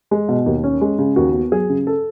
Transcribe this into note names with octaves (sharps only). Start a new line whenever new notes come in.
G#3
B2
D#2
C#4
G#3
C#3
D#2 F#4
B3
F#3 G#4
C#3
A4